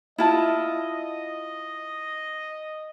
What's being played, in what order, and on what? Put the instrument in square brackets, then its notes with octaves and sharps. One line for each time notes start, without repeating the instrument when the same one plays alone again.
[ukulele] E4 F4 A5 [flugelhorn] D#5